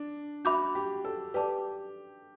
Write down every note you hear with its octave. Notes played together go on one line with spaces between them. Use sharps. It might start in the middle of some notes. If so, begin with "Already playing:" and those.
Already playing: D4
F#4 E5 B5 D6 G6
G4
A4
G4 B4 D5 A5 D6